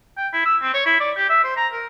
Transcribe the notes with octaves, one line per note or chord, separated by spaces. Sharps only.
G5
E4
E6
C4
C#5
E4
D5
G4
E5
C5
A#5
A#4